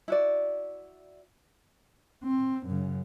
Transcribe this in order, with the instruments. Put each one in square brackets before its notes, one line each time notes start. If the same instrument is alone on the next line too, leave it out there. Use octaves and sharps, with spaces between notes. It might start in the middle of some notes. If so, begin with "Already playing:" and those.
[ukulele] E4 F#4 D5
[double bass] C4
F#2 C#3